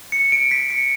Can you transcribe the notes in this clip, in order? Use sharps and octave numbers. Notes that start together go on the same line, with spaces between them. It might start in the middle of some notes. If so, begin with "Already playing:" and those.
C#7
D7
B6
C#7